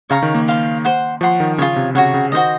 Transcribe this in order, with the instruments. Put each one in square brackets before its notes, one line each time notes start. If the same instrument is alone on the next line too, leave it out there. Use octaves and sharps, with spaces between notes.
[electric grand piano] C#3 [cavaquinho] C#5 F5 A#5 C#6
[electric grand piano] D#3
A#3
[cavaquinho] C5 F5 C6
C5 F#5 C6
[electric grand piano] F3 [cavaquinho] C#5 F#5 C6
[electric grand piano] D#3
[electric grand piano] C#3 [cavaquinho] F4 G#4 C#5
[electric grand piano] C3
[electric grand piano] C#3 [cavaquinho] F#4 C#5 F#5
[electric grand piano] C#3
[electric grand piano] D#3 [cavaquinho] F#4 C5 D#5